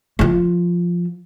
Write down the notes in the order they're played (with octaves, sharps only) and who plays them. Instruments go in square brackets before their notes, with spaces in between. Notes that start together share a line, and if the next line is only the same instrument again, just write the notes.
[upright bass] F3 F4